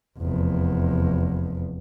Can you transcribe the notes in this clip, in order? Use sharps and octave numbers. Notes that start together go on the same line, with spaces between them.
F1 E2